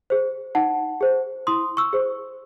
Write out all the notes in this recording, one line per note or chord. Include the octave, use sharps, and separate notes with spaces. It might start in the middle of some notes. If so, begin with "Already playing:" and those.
G#4 C5
D#4 F#5 A5
G#4 C5
E4 C6 D#6
C#6 E6
G#4 C5